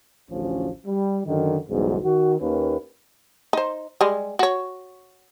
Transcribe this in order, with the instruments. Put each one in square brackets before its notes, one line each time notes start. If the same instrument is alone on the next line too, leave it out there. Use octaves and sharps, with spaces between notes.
[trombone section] A1 D2 F3 C#4
G3
F#2 D3 D#3
B1 E2 G#2 C#3 G3
D#3 F#4
D#2 D#3 A#3 C#4 B4
[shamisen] D#4 C5
G3 G#3
F#4 C#5